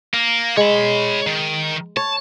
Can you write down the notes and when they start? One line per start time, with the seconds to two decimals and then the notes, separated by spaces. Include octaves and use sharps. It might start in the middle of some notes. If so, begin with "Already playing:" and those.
0.14 A#3
0.57 G#3 C#5 B5
1.27 D#3
1.97 C#5 A5